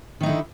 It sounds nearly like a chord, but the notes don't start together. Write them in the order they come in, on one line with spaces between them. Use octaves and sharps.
D#3 D#4 E4 D3